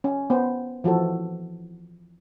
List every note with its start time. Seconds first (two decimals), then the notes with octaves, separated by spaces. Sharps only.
0.04 C#4
0.30 B3 C5
0.84 E3 F3 F#4 A4